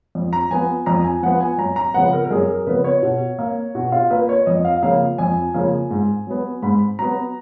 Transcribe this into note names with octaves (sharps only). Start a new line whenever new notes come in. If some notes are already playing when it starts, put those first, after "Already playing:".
F2
A#5
F3 B3 G#5
F2 A#5
G#5
F3 B3 F#5
G#5
F#2 A#5
A#5
C#3 F3 B3 F#5
A#4
A#4
F#2 G#4
A#4
C#3 F3 B3 B4
C#5
B2
A#3
B2 F#4
F4
A#3 B4
C#5
F2 D#5
F5
C#3 F3 A#3 F5
F2 G#5
C#3 F3 A#3
G#2
F#3 B3
G#2 B5
F#3 B3 A#5